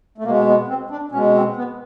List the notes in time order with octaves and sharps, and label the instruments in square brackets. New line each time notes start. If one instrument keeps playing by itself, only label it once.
[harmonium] A3
B2 G#3 A#3
B3
C4
D4
B2 G#3 C#4
C4
B3